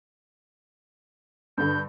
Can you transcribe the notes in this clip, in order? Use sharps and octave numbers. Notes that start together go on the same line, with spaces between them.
G2 D3 G6